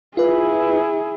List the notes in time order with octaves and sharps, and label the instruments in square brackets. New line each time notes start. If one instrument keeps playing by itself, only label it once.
[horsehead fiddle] E4 G#4 [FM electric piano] F4 B4